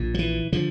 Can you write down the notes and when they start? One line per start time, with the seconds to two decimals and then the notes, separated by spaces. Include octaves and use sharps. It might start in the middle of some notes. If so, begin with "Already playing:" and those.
Already playing: A#1 A#2
0.14 F3
0.19 E3
0.53 D3 F3